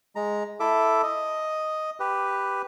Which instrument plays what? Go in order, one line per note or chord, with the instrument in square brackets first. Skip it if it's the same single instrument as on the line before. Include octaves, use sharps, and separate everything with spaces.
[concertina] G#3 A#5
E4 A4 E5 D6
D#5
G4 B4